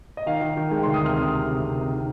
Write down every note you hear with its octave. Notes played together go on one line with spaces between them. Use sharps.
D#5
D#3 F5
D#3
D#3
G#3 G5
D2 C6
D#6
C3 F6
C3 D#6
C3
C3
C3
D#3
D#3